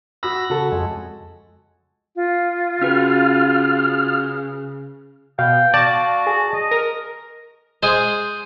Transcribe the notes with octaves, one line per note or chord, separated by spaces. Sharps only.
F#4 B5 E6 A#6
C#3 F#4 A4
F2 G#3
F4
C#3 C#4 F#4 B4 F6
B2 F5 G5
F#4 D5 A5
G#4
D#5
A#4 A#6
G#3 G#4 C5